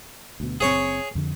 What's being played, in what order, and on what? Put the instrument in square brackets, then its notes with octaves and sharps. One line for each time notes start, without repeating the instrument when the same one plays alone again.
[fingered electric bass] D2 B2
[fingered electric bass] F#1 A2 C4 [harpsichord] G#4 C#5 C#6
[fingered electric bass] F2 D3